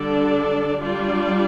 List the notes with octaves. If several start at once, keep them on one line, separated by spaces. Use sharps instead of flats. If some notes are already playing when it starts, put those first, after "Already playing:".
Already playing: D3 G3 D4 A4 D5
G3 D4 F4 D5